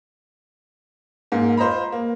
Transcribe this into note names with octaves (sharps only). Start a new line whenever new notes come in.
G#2 A#3
F4 C5 D#5 A#5 B5
A#3